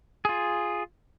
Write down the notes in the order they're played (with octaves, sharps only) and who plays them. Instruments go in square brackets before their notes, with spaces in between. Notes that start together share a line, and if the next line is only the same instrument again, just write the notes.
[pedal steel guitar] F4 G#4